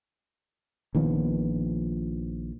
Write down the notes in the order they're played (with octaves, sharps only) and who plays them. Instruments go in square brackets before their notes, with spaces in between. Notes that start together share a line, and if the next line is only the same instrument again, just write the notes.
[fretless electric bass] A#1 D#3 F3 B3